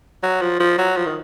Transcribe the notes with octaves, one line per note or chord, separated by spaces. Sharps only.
F#3
F3
F3
F#3
F3
D#3